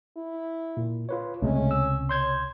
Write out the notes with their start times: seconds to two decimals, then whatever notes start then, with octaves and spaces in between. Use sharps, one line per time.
0.17 E4
0.77 A#2
1.09 F4 B4 C#5
1.42 C#2 C3 G#3 A3 C#4
1.71 E6
2.09 C#5 C6 G6 G#6